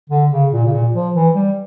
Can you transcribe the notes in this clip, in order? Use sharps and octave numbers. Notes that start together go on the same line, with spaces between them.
D3
C#3
A#2
C#3
A#2
F3
E3
G3